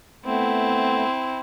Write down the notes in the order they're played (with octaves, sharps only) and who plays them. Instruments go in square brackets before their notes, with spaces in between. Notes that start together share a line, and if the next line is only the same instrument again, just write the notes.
[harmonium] A3 B3 [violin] C4 E4